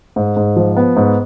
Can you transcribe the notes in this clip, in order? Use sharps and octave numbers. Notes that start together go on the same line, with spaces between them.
G#2
G#2
F3
B3
G#2